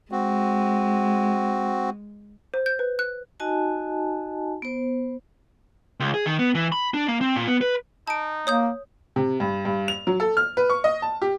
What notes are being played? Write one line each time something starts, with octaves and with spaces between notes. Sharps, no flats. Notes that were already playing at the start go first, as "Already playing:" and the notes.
G#3 C4 F#4
C5
G6
B4
F#6
D#4 F#4 D#5 G#5 A5
B3 C5
C#2
G#4
D#3
B3
E3
B5
D4
A#3
C4
A#2
B3
B4
D#4 A5 D7
A#3 C#5 D#6 G6
C3
G2
G2
F7
F#3
A4
F6
B4
C#6
D#5
A5
G4